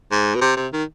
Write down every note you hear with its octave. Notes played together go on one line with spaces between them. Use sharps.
G#2
B2
C3
C3
D#3